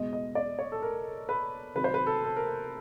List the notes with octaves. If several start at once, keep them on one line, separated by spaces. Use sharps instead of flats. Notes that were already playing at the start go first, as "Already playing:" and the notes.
Already playing: E2 B2 G#3 D#5
D#5
D5
C#5
A4
A#4
B4
C3 D#3 F#3 B4
C5
B4
A4
A4
A#4